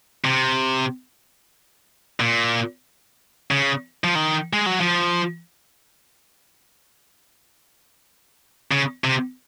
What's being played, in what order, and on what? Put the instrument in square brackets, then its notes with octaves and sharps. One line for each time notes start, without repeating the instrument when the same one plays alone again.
[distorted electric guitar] C3
A#2
C#3
F3
D#3
G#3
F#3
F3
C#3
C3